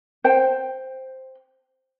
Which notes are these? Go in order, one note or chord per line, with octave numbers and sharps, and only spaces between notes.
C5 G5